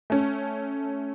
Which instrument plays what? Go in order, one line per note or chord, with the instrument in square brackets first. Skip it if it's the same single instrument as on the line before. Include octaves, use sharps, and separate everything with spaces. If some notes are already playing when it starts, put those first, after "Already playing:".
[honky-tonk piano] A3 C#4